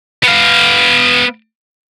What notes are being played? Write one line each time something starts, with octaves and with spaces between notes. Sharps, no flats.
B3 F5